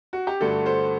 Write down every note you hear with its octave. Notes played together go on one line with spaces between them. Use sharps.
F#4
G4
G2 D3 A3 F#4 A4
A4 C5